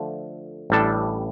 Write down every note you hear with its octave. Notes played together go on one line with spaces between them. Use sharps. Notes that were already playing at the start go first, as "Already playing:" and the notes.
Already playing: D3 F3 A3
A1 A2 G3 D4 A4